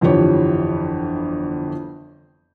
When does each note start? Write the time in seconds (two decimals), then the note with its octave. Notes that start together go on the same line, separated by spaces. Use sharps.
0.01 G1 F2 E3 G4 C#5